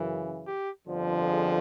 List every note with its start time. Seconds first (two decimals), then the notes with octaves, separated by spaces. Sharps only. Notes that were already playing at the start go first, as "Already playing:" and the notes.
Already playing: F#2 C#3 E3
0.47 G4
0.86 G1 F2 D3 F3
1.27 G#4